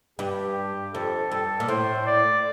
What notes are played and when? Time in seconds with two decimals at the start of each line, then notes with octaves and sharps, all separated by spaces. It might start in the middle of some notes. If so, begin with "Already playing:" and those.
0.19 G2 G4
0.93 F2 A4
1.31 G2 A4
1.60 A#2
1.68 A2 C5
2.06 D5